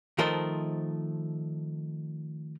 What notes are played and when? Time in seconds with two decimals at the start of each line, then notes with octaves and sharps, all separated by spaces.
0.18 D#3 F3 A3 A#4 C5 D#5